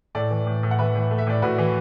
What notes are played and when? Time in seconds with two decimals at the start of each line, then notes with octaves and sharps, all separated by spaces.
0.15 A2 A4 D5
0.31 E3
0.47 A2
0.63 A2
0.71 F#5
0.78 E3 B4 E5
0.95 A2
1.11 A3
1.18 E5
1.27 A2 D5
1.42 A2 F#4 B4
1.58 E3